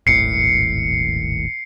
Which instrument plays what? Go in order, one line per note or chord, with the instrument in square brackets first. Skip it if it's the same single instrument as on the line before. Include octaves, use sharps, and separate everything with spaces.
[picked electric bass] D#1 G#1 A2 [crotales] C7 C#7